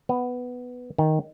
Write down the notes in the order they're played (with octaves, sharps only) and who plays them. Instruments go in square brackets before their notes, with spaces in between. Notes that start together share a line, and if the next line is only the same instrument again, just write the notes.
[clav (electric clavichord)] B3
D#3